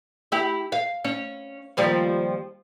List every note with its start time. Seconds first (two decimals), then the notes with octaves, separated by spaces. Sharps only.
0.32 E4 G4
0.72 F5
1.04 C#4
1.77 D#2 F3 G3